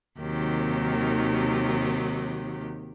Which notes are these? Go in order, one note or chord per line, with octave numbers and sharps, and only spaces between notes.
D#2 C3 D#3 F#3 G4